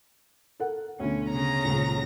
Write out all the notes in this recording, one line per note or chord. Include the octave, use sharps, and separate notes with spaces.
A4 A#4 F#5
D2 B2 D3 C#4
C#3 A#5 A#6
D#1 C#2